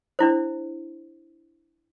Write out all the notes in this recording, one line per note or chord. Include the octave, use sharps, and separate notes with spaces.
D4 E4 C5